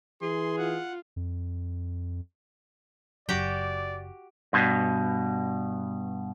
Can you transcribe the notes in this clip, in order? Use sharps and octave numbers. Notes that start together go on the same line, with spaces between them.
E3 G#4 C6
F4 F#5
F2
F#1 F#3 F#4 G4 D5 G5
G2 B2